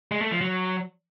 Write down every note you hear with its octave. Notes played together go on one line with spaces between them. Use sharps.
G#3
A3
F3
F#3